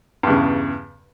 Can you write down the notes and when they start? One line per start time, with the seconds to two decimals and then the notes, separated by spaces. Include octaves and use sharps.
0.23 G2
0.27 E2
0.30 C#3